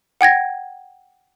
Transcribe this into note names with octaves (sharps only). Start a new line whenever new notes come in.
F#5 G5 G#6 A#6